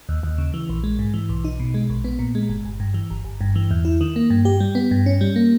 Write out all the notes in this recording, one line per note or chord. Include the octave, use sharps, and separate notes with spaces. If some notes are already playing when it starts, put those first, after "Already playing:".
D#2
D#2
C#3
E3
A#1
G#3
G#2
E3
B1
D#4
B2
G#3
A#1
B3
A#2
G#3
G1
G1
G2
E3
G1
G1
G2
E3
E2
E4
D#3
A#3
G2
G4
G3
B3
G2
C#4
G3
A#3